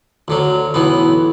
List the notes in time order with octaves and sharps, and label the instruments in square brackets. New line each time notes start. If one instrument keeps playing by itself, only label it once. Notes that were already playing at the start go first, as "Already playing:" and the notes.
[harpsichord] D2 D3 F#3
B1 A2 E3 B3